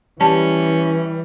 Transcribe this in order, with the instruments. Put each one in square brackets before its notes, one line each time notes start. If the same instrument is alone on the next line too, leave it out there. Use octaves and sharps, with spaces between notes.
[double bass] E3 [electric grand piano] G3 [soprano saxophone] C#4 [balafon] A5